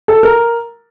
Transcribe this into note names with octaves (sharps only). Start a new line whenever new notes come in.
A4
A#4